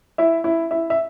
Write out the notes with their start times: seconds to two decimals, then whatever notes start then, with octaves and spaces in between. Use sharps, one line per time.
0.18 E4 E5
0.44 E4 E5
0.71 E4 E5
0.90 E5